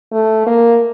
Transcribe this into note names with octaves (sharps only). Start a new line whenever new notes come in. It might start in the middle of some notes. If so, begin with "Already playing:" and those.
A3
A#3